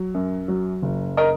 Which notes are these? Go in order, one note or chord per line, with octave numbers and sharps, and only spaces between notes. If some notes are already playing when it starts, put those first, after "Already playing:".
Already playing: F#3
F#2
F#3
F#1
A#4 D#5